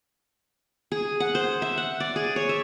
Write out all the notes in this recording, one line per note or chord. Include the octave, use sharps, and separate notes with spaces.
G#4
F#5
C5
E5
F#5
D5
G#4
C#5
E5